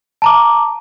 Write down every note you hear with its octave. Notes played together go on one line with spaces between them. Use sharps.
A5 A#5 D6